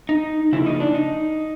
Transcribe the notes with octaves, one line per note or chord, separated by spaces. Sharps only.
D#4
C#3 F3 A#3 E4
D#4
D4
D#4